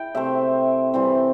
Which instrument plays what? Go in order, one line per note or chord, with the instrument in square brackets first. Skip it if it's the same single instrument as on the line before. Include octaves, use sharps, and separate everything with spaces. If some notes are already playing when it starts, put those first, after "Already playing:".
Already playing: [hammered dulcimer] E4 G5
C3 A3 C4 E5
E3 G3 C4